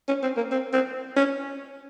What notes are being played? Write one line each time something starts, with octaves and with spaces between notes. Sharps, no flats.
C#4
C4
A#3
C4
C4
C#4